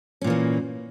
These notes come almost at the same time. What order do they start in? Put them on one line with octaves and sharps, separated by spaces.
C#4 A#2 E3 A#3